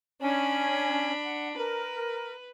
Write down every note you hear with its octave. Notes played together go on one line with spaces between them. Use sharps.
C#4 D4 G#5 B5
F#5
A#4 B4